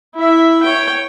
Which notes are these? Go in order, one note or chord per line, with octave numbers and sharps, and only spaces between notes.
E4 E5
C#5 G5